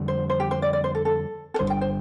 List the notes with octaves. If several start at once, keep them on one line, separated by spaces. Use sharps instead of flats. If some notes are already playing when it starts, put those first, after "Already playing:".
Already playing: F2 D3 G3
C5
C5
G4
C5
D5
D5
C5
A4
A4
A4
G1 G2 D3 G3 C5
G5
C5